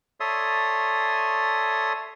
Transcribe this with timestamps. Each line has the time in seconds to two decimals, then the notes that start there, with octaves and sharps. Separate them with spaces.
0.20 A4 C#5 D5 E5 C6 D#6